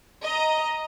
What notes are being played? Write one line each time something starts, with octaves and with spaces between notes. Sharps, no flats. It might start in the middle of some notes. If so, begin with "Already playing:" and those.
D#5 A#5